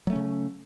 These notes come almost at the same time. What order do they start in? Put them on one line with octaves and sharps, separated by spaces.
F#3 A3 C#4 C#3